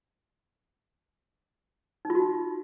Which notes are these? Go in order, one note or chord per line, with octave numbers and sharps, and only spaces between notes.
D#4
F4
F#4
D#4